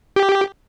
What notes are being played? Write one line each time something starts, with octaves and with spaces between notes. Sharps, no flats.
G4